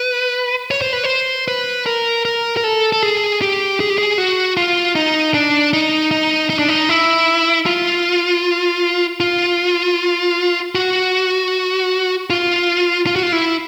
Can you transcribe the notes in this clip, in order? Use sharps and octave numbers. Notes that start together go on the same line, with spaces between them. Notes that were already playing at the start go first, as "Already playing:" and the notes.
Already playing: B4
C#5
C5
B4
C5
B4
A#4
A#4
A#4
A4
A4
G#4
G4
G#4
G4
G#4
F#4
F4
D#4
D4
D#4
D#4
D#4
D4
D#4
E4
F4
F4
F#4
F4
F4
F#4
F4
E4